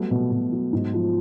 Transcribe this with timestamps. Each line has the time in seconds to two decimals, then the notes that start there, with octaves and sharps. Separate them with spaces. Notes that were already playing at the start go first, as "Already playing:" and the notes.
Already playing: F#3 G3 A3 B3
0.11 B2
0.31 B2
0.52 F#3
0.73 G#2
0.93 F3